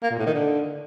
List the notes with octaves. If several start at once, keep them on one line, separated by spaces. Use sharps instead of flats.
A#3
A#2
A2
D#3
D3